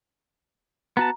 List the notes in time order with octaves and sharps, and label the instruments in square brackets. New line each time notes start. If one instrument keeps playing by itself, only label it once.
[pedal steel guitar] B3 F#4 A5 [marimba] A#5